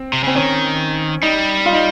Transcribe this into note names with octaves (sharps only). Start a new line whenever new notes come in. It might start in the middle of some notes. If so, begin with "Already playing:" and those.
Already playing: C4
C3
C#3 C4
D#3 C#4
G3 D#4
F4
D#4